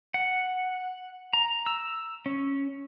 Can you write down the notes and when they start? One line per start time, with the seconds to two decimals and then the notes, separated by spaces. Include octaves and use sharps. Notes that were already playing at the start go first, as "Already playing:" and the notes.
0.14 F#5
1.33 A#5
1.66 E6
2.26 C#4